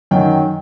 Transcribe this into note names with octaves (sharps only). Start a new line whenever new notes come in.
F#2 D#3 F#3 G5